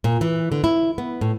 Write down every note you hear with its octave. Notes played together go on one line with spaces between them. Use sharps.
A#2
E3
D3
E4
B3
A2